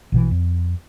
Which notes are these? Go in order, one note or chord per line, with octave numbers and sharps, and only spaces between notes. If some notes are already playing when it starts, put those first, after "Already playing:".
A#1 B2 E3
F2